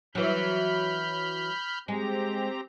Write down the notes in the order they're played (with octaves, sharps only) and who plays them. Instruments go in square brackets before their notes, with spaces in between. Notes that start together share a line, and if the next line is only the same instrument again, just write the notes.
[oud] E3 F#3 [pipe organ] B5 F6 G6
[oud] G#3 [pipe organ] C4 G4 A#5